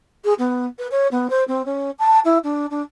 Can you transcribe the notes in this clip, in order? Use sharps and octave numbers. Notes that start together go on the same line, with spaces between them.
G#4
B3
B4
C#5
B3
C5
C4
C#4
A5
E4
D4
D4